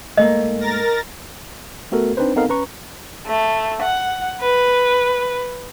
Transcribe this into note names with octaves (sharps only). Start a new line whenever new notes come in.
G#2 A3 A#3 D#5
A#4 A6 A#6
A3 B3 F#4 A4 A#4
C4 D4 D#4 B4 C5
B3 C4 D#4 A4 A#4 F5
C#4 B4 A#5 C#6
A3
F#5
B4